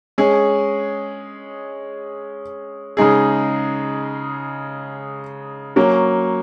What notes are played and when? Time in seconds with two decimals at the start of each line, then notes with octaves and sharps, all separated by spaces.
0.18 G#3 C#4 G#4
2.97 C#3 G#3 D#4 G#4
5.76 F#3 A#3 C#4